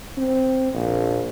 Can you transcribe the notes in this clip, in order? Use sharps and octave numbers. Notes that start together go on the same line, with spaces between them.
C4
A#1